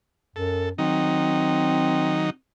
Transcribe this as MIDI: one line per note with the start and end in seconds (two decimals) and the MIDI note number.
0.36 0.70 42
0.36 0.69 69
0.78 2.30 51
0.78 2.30 54
0.78 2.35 60
0.78 2.30 63